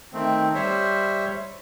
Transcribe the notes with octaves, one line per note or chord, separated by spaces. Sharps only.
D#3 A3 C4
G3 C5 C#5 E5